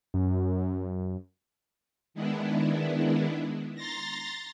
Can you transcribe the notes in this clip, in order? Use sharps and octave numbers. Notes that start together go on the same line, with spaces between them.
F#2
D#3 G#3 B3 D4 E4
A#5 C6 A6 A#6